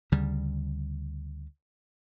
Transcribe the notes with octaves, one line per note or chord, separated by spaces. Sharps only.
D2 C#3 G3